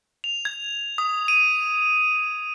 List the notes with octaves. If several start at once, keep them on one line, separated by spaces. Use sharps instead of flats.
F7
G#6
D#6
D#7